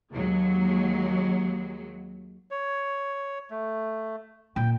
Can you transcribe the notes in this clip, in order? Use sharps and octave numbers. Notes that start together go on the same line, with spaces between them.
D#2 F#3 G#3
C#5
A3
A#2 G5